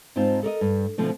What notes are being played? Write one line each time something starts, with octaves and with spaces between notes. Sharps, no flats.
G#2 C4 D#4 F4 A5
A4 A#4 D5 D#5
G2
B2 D3 F3 A3 C4